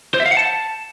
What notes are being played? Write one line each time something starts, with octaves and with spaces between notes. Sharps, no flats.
C5
E5
F5
F#5
A5